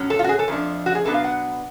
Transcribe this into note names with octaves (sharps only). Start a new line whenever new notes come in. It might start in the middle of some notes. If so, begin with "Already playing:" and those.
Already playing: A2 F#3 C#4
A4
F4
F#4
G#4
A4
F2 F3 A3 D4
F#4
G#4
B2 F#3 B3 D4 A4
F5
F#5